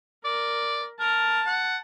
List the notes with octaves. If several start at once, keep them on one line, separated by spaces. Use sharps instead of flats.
A#4 D5
A#4 A5
F#5